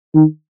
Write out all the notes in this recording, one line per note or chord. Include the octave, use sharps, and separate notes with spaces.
D#3